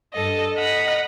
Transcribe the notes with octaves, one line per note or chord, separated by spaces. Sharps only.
G2 A4 D#5
D#5 F#5 A#5 B5